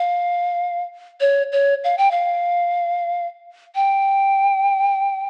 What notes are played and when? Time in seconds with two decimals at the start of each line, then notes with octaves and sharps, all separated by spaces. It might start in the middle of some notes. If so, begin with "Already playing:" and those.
Already playing: F5
1.21 C#5
1.52 C#5
1.84 F5
1.98 G5
2.11 F5
3.75 G5